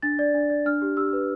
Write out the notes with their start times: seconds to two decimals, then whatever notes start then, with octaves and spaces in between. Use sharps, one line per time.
0.02 D4 A6
0.19 D5
0.34 D4
0.50 D5
0.66 D4 F6
0.82 G4
0.97 G4 E6
1.13 B4